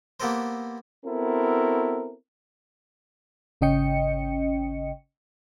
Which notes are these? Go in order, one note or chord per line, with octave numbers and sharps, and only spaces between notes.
A#3 B3 G4 A4 A#4 C5
B3 C4 E4 F#4 A4 A#4
G#1 C#3 C#4 D#5 G5 C#7